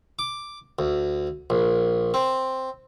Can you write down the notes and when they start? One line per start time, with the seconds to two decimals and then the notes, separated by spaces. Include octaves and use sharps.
0.19 D6
0.79 D2
1.50 A#1
2.14 C4